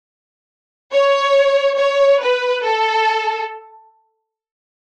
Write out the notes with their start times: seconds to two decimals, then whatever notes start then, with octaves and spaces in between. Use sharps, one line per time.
0.93 C#5
1.78 C#5
2.21 B4
2.64 A4